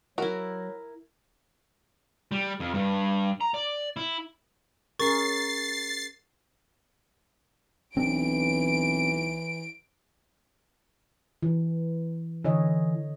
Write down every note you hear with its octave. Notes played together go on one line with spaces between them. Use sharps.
F#3 E4 F#4 A#4
G3
F2
G2
A#5
D5
E4
C#4 G#4 A#4 C#6 A6 C7
B1 E3 C4 D4 D7
E3
D3 E3 C#5 D#5